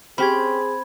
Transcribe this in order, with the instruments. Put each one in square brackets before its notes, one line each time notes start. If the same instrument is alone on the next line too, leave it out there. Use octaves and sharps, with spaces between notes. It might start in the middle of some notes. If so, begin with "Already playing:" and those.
[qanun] C4 [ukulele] C#4 G4 [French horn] G#4 [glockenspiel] B5 G#6